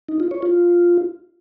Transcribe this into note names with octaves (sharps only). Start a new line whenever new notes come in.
D#4
F4
C#5
F4